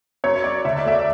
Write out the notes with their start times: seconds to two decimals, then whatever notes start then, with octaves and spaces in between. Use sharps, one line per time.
0.24 F#2 C#5
0.44 F#2 D5
0.65 D2 E5
0.79 D5
0.85 A3 E5
0.92 D5